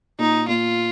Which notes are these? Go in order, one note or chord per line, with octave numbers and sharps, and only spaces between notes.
A#2 D#4
A#2 F4